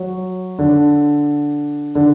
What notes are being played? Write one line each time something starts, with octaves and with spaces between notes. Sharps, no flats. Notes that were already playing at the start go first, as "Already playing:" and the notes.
Already playing: F#3
D3
D3